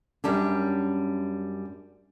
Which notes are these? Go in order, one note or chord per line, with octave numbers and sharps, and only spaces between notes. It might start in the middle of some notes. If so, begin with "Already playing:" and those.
F#2 G3 C#4 D4